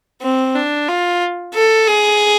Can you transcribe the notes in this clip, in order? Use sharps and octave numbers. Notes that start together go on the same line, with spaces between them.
C4
D4
F4
A4
G#4